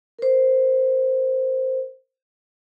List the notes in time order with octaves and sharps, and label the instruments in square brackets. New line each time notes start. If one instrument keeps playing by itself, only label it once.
[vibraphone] A#4 C5